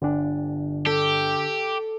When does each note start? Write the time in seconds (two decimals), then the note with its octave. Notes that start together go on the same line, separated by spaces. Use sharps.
0.02 G1 D3 D4
0.86 G4 A4